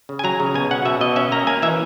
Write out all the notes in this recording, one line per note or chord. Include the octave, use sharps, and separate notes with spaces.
C#3
G#5
F#3 A#5
C#3
B2 G#5
C#4 F#5
B2 E5
B2 D#5
C#4 E5
A#3 A#5
A#3 G#5
E3 E5